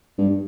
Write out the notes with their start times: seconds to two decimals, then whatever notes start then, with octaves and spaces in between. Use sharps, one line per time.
0.18 G2